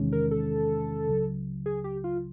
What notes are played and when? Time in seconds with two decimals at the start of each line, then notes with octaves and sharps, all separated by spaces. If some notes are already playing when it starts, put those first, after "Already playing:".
Already playing: E2 C3 D#3 G#3 C#4
0.12 A#4
0.31 A4
1.08 C#2 C#3 F#3
1.66 G#4
1.84 G4
2.04 F4